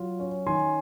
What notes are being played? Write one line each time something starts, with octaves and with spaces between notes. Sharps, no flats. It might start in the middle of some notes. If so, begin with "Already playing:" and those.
Already playing: F#3 F4
C#4
D#3 G#5 C6